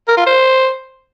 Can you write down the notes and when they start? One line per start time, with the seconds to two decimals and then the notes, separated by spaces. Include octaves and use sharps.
0.08 A#4
0.17 F4
0.26 C5